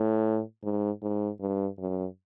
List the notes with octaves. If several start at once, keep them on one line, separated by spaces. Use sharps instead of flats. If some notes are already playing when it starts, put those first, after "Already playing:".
Already playing: A2
G#2
G#2
G2
F#2